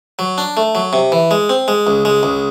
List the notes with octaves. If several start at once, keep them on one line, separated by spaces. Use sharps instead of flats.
F#3
D4
A3
F#3
C3
E3
G#3
C4
G#3
C#2
G#3
C#2